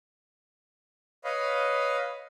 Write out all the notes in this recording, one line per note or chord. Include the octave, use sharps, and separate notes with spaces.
B4 C#5 D#5 F5 B5